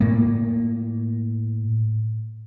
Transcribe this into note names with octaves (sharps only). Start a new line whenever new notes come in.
A2 A#3